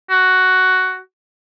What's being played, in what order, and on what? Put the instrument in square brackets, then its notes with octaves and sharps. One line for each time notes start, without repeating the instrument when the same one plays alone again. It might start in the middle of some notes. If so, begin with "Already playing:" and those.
[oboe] F#4